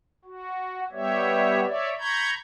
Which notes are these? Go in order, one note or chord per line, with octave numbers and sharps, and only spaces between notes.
F#4
G3 B3 G4 C#5 E5
C#5 D5 E5
A#5 B5 C#6 G6 G#6